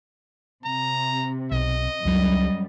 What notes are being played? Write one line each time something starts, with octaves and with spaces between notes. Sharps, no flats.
C3 A#5
B1 D#5
C#2 F#2 F#3 G3